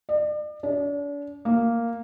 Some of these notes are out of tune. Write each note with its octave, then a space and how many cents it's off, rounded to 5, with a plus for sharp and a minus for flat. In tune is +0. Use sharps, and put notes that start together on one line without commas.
D5 +40
D4 -40
A#3 -5